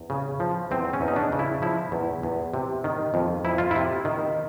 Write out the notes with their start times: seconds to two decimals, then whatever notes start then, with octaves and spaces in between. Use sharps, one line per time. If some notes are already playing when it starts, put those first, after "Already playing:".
Already playing: E2
0.10 C#3
0.40 F3
0.71 E2 C4
0.93 C#4
1.01 E2
1.08 D#4
1.16 D4
1.32 C#3
1.39 E4
1.62 F3 E4
1.92 E2
2.23 E2
2.54 C3
2.84 D#3
3.14 F2
3.45 F2 E4
3.58 F4
3.71 C3 E4
4.05 D#3